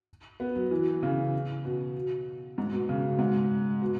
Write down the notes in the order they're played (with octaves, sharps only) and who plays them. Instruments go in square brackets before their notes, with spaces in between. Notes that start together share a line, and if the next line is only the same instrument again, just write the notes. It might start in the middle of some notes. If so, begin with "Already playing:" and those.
[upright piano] B3
F#3
E3
C#3
B2
G#2
B2
C#3
G#2
B2